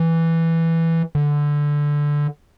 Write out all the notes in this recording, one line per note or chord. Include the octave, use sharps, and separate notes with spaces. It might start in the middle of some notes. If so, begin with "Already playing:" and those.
Already playing: E3
D3